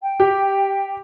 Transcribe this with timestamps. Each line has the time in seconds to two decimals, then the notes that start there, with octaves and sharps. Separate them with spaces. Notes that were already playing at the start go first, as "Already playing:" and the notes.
0.02 G5
0.20 G4